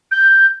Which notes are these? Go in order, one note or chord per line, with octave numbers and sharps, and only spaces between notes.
G6